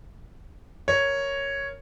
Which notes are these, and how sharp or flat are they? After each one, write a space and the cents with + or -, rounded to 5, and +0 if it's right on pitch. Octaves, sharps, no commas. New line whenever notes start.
A#4 +0 C#5 +0